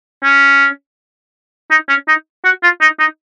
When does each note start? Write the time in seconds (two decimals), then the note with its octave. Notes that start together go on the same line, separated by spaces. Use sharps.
0.23 C#4
1.71 D#4
1.89 C#4
2.08 D#4
2.45 F#4
2.63 F4
2.81 D#4
2.99 D#4